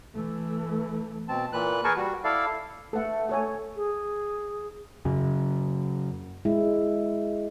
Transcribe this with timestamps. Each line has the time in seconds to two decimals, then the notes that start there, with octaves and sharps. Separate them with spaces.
0.15 E3 A3
1.28 B2 C4 A5
1.53 A#2 E3 B4 F#6
1.84 G#4 A#4 B4 G#5 A5 C#6
1.96 G3 F#4
2.24 E4 A4 D5 F5
2.93 A3 A4 B4 F#5
3.29 A4 C#5 G#5
3.76 G#4
5.05 F#2 C#3
6.45 G#3 E4